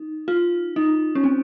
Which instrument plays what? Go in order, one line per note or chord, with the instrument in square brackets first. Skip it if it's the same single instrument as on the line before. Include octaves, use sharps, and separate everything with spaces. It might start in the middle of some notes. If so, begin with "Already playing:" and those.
Already playing: [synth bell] D#4
F4
D#4
C#4
C4